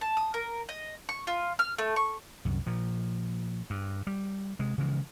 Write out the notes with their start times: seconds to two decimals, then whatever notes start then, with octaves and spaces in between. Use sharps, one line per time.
0.01 A5
0.17 D#6
0.34 A#4
0.69 D#5
1.09 C#6
1.27 F4
1.59 F6
1.78 A3
1.96 C#6
2.45 C2 F#2
2.66 A#2 F3
3.70 G2
4.07 G3
4.59 C3 G#3
4.78 C#3 E3 F3 G#3